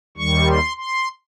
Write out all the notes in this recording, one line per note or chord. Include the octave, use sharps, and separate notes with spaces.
D#2 D#3 G3 C#6
C6
C6